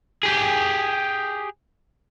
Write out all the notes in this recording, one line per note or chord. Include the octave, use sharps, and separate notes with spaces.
G4 G#4